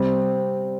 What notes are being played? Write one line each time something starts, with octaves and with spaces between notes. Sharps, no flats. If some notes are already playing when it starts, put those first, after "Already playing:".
Already playing: C3 G3 C4